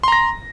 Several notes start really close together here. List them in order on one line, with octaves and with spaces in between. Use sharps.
C6 A#5 A#6